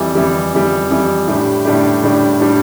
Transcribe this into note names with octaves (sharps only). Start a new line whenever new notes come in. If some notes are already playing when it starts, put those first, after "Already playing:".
Already playing: F2 E3 G3
F2 E3 G3
F2 E3 G3
F2 E3 G3
A2 G3 D4 G4
A2 G3 D4 G4
A2 G3 D4 G4
A2 G3 D4 G4